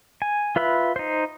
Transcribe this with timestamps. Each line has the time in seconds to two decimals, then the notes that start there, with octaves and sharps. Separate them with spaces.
0.22 G#5
0.56 F4 B4 E5 B5
0.96 D#4 C5